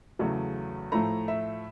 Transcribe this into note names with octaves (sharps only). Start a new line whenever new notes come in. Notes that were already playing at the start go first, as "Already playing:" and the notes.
E2 C#3 F#3 A3
A2 F3 A3 A#5
E5